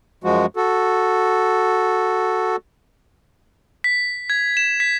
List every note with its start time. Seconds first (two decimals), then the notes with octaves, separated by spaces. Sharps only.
0.24 F#2 F3 G#3 F#4
0.56 F#4 A4
3.84 B6
4.30 G#6
4.57 E7
4.80 B6